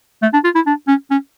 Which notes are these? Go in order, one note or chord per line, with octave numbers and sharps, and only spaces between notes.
A3
D4
F4
E4
D4
C#4
C#4